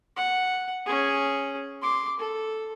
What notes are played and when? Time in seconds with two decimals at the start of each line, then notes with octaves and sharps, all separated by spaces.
0.16 F#5
0.86 C#4 G#4
1.82 C6 D6
2.20 A4